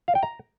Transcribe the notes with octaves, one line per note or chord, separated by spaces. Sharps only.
F5
G5
A#5